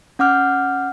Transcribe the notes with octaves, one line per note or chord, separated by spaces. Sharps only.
C#4 F#5 D6 F6 G6